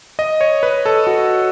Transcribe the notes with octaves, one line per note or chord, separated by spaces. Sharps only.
D#5
C#5
B4
A4
F#4